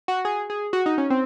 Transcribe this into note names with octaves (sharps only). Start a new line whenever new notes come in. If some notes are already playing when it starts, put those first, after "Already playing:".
F#4
G#4
G#4
F#4
D#4
C#4
C4